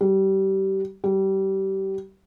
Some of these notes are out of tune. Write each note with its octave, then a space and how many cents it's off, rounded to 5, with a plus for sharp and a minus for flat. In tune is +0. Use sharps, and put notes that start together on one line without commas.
G3 -25
G3 -25